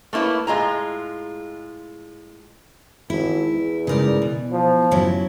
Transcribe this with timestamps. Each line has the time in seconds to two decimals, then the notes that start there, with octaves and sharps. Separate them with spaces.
0.13 A3 A#3 E4 B4 C#5
0.47 A2 G#3 F4 A#5
3.10 G#1 E4
3.50 E2
3.87 G2 C#3 G#3 D#4 A#4 D5
4.22 B2 E3
4.52 F3
4.91 F#2 A2 C#3 F#3 E4 C#5